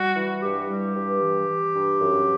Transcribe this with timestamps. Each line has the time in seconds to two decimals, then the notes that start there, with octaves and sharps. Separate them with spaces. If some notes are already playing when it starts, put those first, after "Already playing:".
Already playing: G3 F#4
0.16 E3
0.43 G2 G4
0.68 G3
0.95 G2
1.21 E3
1.47 E3
1.75 G2
2.00 F#2